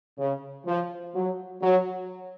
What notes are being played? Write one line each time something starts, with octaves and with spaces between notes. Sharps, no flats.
C#3
F3
F#3
F#3